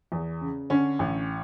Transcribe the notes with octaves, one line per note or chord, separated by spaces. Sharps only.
E2
C#3
D3 C#4
A1